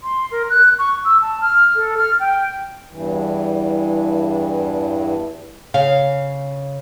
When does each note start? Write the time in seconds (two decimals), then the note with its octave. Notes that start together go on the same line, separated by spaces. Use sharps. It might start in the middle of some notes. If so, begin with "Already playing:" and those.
0.03 C6
0.31 A#4
0.50 F#6
0.79 C#6
1.05 E6
1.22 A5
1.41 F6
1.75 A4
1.98 F6
2.20 G5
2.91 E2 G2 E3
5.74 C#3 F5